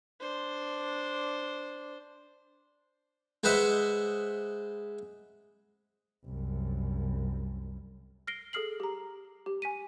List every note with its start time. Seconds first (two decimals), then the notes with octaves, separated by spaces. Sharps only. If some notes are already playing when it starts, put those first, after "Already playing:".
0.21 D4 C5
3.44 G#3 B4 C5 D#5 E5 F#5
6.25 C2 F#2
8.27 F6 A#6 C7 D7 G7
8.53 G#4 A4 D#6 F6 C7 F#7
8.80 G4 A#5
9.46 G4
9.62 G#5 B6 D#7